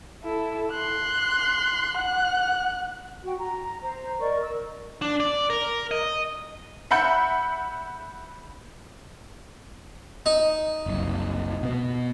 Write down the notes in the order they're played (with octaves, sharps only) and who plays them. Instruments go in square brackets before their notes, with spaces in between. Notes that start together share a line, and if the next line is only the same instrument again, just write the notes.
[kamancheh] E4 A4
C6 F#6
F#5 F#6
[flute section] F#4 G5
A#5
C5 A#5
A#4 D5 D#5 C#6
A#4 E6
[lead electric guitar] D4
D5
A#4
D#5
[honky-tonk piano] E5 F#5 B5 G6 C#7
[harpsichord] D#4
[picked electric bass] F#1 C2
B2 B3